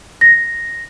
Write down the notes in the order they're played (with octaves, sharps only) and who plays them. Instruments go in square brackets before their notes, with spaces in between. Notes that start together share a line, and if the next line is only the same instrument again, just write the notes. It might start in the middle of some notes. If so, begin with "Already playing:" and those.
[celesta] A#6